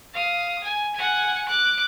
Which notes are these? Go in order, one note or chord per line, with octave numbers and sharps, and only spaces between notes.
F5 D#6
G#5
F#5 G#5
D6 F#6